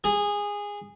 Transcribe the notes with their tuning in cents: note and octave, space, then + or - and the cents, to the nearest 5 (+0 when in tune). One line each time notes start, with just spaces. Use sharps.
G#4 -15